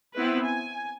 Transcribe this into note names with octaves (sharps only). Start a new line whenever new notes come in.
B3 C4 E4 B4
G#5